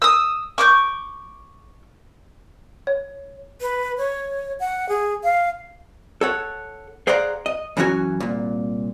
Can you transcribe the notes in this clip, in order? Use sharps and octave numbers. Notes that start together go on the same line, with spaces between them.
D#6 E6
C#6 D6 F#6 G6
C#5
B4
C#5
F#5
G#4
F5
A4 C#5 F#5
G#4 C5 D5 F5 F#5 A#5
D#5
F#2 E3 A3 C#4 F#4 G#5
C2 A#2